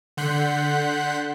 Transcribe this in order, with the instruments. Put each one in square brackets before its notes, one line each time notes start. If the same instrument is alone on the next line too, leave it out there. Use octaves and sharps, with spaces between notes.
[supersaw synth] D3 F#5 C6 F#6 G6 B6